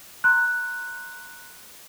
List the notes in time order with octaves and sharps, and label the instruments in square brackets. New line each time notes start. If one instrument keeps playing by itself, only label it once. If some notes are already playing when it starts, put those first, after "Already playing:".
[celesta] A#5 C6 F#6